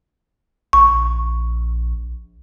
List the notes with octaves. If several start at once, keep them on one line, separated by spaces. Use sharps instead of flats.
A#1 C#6